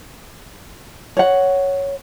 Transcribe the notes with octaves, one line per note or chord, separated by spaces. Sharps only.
C#5 F#5